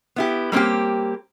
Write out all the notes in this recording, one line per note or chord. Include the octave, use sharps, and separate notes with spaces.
B3 E4 G4
G3 A#3 C4 C#4 G4